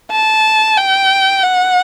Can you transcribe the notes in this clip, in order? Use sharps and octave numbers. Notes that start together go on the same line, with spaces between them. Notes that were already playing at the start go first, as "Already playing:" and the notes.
A5
G5
F#5